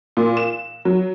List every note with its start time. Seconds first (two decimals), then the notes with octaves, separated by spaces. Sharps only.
0.17 A#2
0.37 E7
0.85 F#3